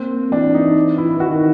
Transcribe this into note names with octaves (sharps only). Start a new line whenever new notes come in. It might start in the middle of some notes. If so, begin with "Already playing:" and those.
Already playing: A#3 C4
E3 D4
D#4
E4
D#3 F#4